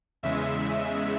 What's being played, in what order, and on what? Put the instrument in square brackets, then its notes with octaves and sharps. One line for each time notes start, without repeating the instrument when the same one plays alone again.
[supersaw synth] E2 C#3 G#3 E5